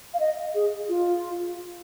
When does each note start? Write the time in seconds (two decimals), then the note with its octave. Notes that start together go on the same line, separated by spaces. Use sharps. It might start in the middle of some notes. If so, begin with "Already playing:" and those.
0.14 F5
0.20 D#5
0.55 G#4
0.89 F4